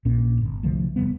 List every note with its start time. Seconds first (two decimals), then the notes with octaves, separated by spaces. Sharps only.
0.05 A#1 A#2 C#4
0.41 G1
0.63 C2 D3 F3 A3
0.96 F1 D#2 G3 B3